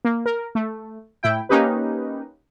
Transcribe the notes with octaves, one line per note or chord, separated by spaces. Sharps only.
A#3
A#4
A3
A2 E4 G5
A#3 C#4 D#4 G4 B4